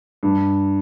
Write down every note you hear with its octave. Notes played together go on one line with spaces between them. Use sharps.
G2